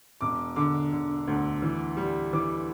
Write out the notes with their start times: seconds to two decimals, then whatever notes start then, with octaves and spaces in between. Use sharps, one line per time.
0.21 E1 D6
0.56 D3 D6
0.92 D3
1.27 D2
1.62 E3
1.97 G3
2.33 E3 D6